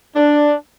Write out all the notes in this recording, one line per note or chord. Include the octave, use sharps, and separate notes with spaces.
D4